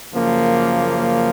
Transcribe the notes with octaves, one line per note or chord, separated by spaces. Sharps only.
F#2 C#3 F3 A#3